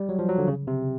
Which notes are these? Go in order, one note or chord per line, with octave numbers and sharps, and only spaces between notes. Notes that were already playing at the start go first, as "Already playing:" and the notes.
Already playing: G3
F#3
F3
F#3
D3
C#3
C3